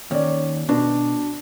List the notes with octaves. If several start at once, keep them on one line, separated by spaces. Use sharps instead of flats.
D#2 C#4 D5
B2 D4